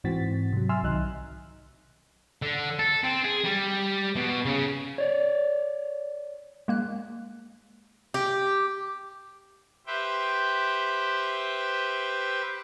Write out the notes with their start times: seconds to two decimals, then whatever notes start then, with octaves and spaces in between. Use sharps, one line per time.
0.04 G#2 E3 C4 F#4 A6 B6
0.52 C3 F#3
0.69 E5 G#5 C6 E6 F6
0.83 B1 D#3 F#3 D#4 F#6
2.42 D3
2.79 A4
3.04 C4
3.24 G#4
3.44 G3
4.16 B2
4.45 C#3
4.98 C#5 D5
6.68 G#3 A#3 F#6
8.14 G4
9.87 G4 B4 C5 E5 G5